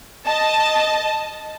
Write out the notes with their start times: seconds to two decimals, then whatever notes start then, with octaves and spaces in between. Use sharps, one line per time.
0.24 D#5 A5